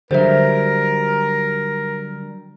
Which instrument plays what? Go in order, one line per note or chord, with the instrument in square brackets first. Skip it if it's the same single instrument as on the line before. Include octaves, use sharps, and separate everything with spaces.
[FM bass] D3 [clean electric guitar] F#3 G3 [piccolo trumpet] A#4 [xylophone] C5 E5